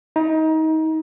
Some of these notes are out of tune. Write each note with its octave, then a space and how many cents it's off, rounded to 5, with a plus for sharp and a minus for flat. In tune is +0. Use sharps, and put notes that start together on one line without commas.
D#4 +25